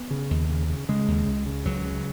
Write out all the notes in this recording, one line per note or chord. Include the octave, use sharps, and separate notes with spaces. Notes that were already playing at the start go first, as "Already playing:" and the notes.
Already playing: B3
C#3
D#2
C#3
C#3
C#3 G#3
D#2
C#2
C#3
C#2 F#3
C#3